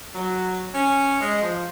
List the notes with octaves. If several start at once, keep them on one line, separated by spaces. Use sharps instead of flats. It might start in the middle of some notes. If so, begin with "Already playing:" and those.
F#3
C#4
G#3
F3